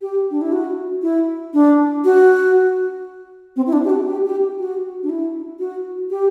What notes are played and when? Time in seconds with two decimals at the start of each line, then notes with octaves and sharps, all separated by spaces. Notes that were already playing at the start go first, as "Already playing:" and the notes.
0.02 G4
0.31 D4
0.41 E4
0.52 F#4
1.02 E4
1.54 D4
2.04 F#4
3.56 C4
3.67 E4
3.73 D4
3.85 G4
3.90 F#4
4.08 G4
4.26 G4
4.59 F#4
5.03 D4
5.09 E4
5.59 F#4
6.10 G4